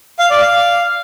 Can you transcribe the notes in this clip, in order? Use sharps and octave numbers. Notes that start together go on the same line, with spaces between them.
F5
D5
F5